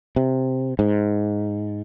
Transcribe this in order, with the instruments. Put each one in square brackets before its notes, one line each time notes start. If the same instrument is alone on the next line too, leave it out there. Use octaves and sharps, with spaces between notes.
[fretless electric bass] C3
G#2